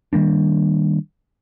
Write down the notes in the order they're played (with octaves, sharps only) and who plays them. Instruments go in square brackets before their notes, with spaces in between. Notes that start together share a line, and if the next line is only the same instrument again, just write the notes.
[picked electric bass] D#3 G3 A#3 D4